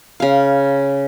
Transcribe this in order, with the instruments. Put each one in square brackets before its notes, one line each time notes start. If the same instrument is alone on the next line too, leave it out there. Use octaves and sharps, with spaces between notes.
[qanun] C#3 F5